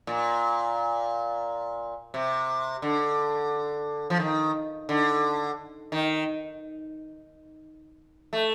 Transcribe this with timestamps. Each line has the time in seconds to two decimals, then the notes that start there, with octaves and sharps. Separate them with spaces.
0.07 A#2
2.14 C3
2.82 D3
4.10 F3
4.20 D#3
4.89 D3
5.92 D#3
8.33 A3